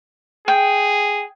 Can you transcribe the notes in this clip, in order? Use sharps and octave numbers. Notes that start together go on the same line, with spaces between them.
G#4 G5